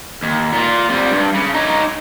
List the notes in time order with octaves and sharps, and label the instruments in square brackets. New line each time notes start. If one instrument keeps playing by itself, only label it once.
[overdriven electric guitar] D#2
A#2 F4
C3 G3
G2
C#3
D#4 C#5